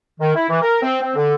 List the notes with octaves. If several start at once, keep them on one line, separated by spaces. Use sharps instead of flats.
D#3
E4
E3
A#4
C4
C4
D3